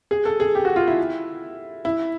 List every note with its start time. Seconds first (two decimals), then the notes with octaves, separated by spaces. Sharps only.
0.11 G#4
0.25 A4
0.40 G#4
0.55 G4
0.65 F#4
0.76 F4
0.88 E4
1.85 E4